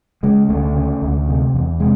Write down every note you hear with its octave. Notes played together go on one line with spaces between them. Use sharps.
C#3 G#3
D2 A3
C#3
D2
C3
E2
C3 G#3